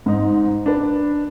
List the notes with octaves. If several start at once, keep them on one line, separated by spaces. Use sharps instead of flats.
G#2 D#4
D4 B4